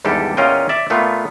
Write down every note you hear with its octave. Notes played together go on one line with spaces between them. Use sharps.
G#1 E2 G3 D4 G4 A4
E2 A#2 C#4 F4 D#5 G5
D5 E5
A#2 A3 B3 F4